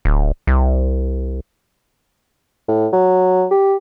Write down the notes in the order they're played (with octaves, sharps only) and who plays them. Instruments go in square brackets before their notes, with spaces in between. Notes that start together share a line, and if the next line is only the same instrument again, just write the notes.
[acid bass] D1
C2
[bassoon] A2
F#3
G4